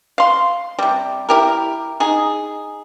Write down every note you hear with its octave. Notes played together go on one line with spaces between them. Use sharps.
F5 C6
C3 G3
E4 G4 A#4
D#4 G#4